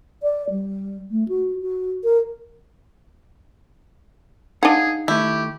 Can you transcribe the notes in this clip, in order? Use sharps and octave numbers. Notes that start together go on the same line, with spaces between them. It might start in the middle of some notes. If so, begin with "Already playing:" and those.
D5
G3
A3
F#4
F#4
A#4
D4 D#4 G#4 F5 F#5
D#3 A3 E4 G4